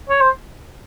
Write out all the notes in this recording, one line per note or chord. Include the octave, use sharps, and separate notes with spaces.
C#5
C5